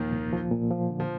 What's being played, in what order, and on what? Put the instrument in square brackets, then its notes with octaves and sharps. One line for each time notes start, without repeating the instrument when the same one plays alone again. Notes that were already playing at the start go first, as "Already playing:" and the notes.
Already playing: [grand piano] D#2 D#3 [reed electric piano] A#2 F3 A#3
[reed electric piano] C2
F3
A#2
F3
D3
[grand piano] F3